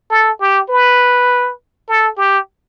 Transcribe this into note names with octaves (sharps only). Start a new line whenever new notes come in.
A4
G4
B4
A4
G4